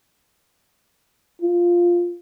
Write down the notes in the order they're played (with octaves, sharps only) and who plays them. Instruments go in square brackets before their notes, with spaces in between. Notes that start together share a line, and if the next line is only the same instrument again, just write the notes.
[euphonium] F4